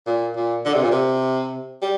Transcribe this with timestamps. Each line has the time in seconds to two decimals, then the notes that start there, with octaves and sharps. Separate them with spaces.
0.07 A#2
0.36 A#2
0.65 D3
0.74 C3
0.82 A#2
0.92 C3
1.82 G3